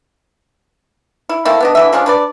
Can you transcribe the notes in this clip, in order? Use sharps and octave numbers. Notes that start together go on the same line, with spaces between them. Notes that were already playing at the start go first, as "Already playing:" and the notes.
E4
A3 A#3 C4 E4
B3 D4 D#5
D3 E3 E5
F3 G#3 C#4 D4
D4 B4 D5